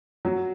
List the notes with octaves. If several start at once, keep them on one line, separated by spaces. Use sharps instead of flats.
F#3 F#4